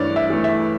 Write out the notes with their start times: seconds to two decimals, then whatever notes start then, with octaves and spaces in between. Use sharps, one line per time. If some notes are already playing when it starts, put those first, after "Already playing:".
Already playing: G2 E3 A3 C#5 D5
0.16 E5
0.30 E3 A3
0.44 E5